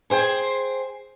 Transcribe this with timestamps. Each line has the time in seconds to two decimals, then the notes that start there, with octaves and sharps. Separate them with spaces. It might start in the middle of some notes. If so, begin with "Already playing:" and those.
0.10 G#4 C5 G5 G#5